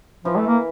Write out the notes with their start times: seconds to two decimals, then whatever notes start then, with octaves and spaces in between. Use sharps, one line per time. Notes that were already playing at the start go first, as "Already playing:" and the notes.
0.25 E3 F3
0.36 A3
0.47 A#3